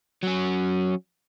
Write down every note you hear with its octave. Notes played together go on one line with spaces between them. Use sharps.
F#3 C#4